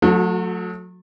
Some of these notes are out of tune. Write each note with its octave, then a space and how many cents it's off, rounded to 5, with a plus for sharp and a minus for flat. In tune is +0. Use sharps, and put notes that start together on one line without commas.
F#3 -35 A3 +0 F#4 +0